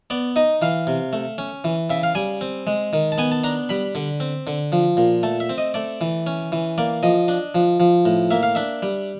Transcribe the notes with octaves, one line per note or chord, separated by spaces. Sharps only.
B3 D5
D#4 D#5
E3 F5
C3
A3
C#4
E3
C#3 E5
F5
G3 G#5
C4
G#3
D#3
A5
B3 G#5
A5
D4 A#5
G3 B5
D3
C4
D3
F3
A#2
A3 A5
E5
C4
D#5
A3 D5
E3
C#4
E3
A#3 D5
F3 D#5
D4
F3
F3
A2
A#3 E5
F5
D4 E5
G3